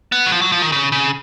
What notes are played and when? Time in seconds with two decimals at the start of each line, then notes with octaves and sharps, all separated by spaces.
0.12 B3
0.26 F#3
0.32 F3
0.41 F#3
0.52 F3
0.62 D#3
0.72 C#3
0.92 C#3